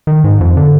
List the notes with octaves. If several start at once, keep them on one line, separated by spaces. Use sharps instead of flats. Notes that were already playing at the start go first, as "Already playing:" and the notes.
D#3
G#2
F2
D3